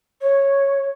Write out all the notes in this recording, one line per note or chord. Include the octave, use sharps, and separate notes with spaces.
C#5